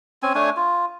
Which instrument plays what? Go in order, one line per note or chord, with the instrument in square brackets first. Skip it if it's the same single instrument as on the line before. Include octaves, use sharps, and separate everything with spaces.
[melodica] C4 C#4 G#5
A3 D4 C#5 G#5
F4